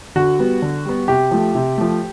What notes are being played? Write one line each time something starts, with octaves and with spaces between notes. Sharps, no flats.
D3 F#4
G3 B3
D3
G3 B3
C3 G4
F3 A3
C3
F3 A3